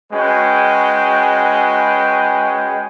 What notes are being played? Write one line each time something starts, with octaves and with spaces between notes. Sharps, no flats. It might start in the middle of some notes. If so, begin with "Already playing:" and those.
G#3 C#4 F#4 B4 G5